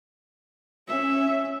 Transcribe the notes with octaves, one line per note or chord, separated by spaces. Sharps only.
C#4 E5